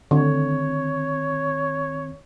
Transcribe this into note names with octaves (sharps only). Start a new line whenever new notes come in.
D3 D#3 C4 C#5